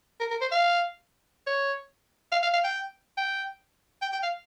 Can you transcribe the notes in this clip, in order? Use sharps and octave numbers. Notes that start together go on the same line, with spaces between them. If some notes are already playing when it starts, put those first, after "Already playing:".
A#4
A#4
C5
F5
C#5
F5
F5
F5
G5
G5
G5
G5
F5